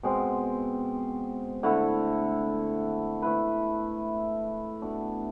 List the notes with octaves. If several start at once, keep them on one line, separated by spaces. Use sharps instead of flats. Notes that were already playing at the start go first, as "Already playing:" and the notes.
B2 G#3 C4
D3 A3 E4 A4
A3 E4 B4
B2 A3 D4